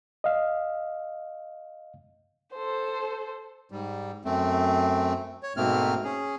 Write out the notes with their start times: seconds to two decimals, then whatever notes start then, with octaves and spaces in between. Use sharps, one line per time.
0.24 D#5 F5
2.54 A4 C5
3.71 G#2 G3
4.25 F#2 A3 C4
5.43 C#5
5.57 G#2 B2 A3 A#3 C4 F6
6.04 C#4 G#4